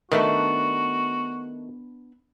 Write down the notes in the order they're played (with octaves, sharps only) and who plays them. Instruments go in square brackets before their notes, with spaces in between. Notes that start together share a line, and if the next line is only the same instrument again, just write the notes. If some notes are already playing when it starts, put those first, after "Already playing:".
[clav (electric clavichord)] D#3 A3 [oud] B3 D4 E5 [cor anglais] F#4